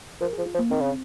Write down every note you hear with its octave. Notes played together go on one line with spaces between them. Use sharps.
F3 A#4
F3 G#4
F4
F3
A#3
D#3 C4
C#3